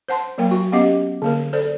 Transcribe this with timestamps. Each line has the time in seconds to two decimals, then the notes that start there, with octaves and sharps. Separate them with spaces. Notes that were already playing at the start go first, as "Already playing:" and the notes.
0.08 C5 F#5 A5 C6
0.38 F#3 A#3 A#4 G5
0.51 F#4
0.72 B3 C#4 G4 D#5 F#5 D6
1.22 D3 A#3 A#4
1.53 A4 C5 D5